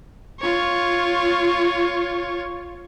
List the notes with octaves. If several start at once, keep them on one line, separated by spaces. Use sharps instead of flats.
F4 C#5